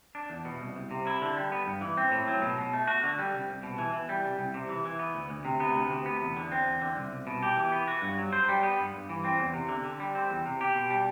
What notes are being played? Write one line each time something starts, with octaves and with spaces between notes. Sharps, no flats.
D4
E2
B2
C2
C2
C3
E4
D3
G3
B3
G2
E3
C4
A2
F#3
B2
B2
A3
F#4
D3
G3
C2
C2
B2
E3
E3
G3
C2
C2
C3
E3
E3
B3
D2
D2
C3
B3
D2
C3
B3
E2
D3
C4
E2
D3
C2
C2
B2
G4
E3
B3
F#4
G2
F#3
C5
G3
B3
G2
G2
E3
C4
E2
C3
D3
D3
G3
C4
E2
C3
G4
B2
G3